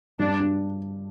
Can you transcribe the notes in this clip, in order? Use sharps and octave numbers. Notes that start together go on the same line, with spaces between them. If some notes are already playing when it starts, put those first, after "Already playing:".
G2 D4
D4